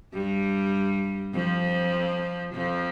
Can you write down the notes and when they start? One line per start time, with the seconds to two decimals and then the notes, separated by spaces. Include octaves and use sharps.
0.14 G2 G3
1.34 F2 F3
2.54 F2 F3